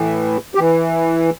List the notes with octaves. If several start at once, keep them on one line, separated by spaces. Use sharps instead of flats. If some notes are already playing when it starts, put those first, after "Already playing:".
Already playing: A2 E3
G4
E3